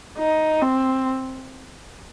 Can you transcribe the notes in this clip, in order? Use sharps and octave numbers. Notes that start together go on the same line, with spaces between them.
D#4
C4